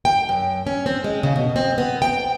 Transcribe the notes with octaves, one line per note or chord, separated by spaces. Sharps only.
G5
F#2
C#4
C4
G#3
C#3
B2
C4
B3
G5